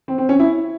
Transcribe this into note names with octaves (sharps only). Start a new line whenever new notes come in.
C4
C4
C#4
E4